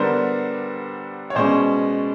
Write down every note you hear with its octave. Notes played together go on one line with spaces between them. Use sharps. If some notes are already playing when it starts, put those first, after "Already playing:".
Already playing: D3 G3 B3 D4 A#4 C5
C#5
B2 G#3 C#4 C5 D5